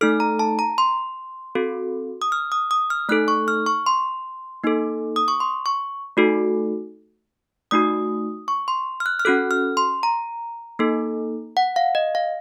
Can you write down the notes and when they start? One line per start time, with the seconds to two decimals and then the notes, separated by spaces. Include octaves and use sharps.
0.01 A3 D#4 A4 F6
0.20 A#5
0.39 A5
0.59 A#5
0.78 C6
1.55 C4 F#4 A4
2.22 D#6
2.32 F6
2.52 D#6
2.71 D#6
2.90 F6
3.09 A3 D#4 A4 F#6
3.28 C#6
3.48 F6
3.66 C#6
3.86 C6
4.64 A#3 D#4 A4
5.16 D#6
5.28 C#6
5.40 C6
5.66 C#6
6.17 A3 D#4 F#4 A4
7.71 A3 D#4 F#4 D#6
8.48 C#6
8.68 C6
9.00 F6
9.06 F#6
9.19 F6
9.25 C#4 F#4 A4 F#6
9.51 F6
9.77 C6
10.03 A#5
10.79 A#3 D#4 A4
11.57 F#5
11.76 F5
11.95 D#5
12.15 F5